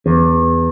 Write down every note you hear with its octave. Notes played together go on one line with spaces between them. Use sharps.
E2